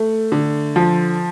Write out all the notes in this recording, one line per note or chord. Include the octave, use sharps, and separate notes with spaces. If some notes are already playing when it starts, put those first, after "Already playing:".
Already playing: A3
D3
F3